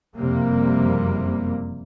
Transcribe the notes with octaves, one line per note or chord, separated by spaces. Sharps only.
F#1 F2 C3 G3 A#3